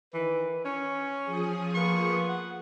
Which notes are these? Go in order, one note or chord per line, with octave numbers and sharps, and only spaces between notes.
D#3 E3 B4
C#4 C#5
F3 G#4 D#6
A#3 B3 F4 C#6
F#5